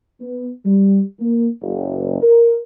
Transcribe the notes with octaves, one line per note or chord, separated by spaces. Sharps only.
B3
G3
A#3
F#1
A#4